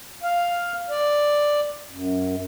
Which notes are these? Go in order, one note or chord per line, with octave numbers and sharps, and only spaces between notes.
F5
D5
F#2